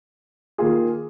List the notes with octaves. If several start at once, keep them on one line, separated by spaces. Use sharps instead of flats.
D#3 A#3 F4 G#4